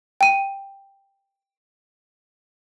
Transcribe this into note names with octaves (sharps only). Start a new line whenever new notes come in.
G5 D#7